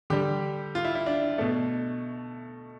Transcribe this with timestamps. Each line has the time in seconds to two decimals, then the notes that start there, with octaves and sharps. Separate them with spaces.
0.10 D3 G3 G4
0.75 F4
0.85 E4
0.95 E4
1.06 D4
1.38 B2 A3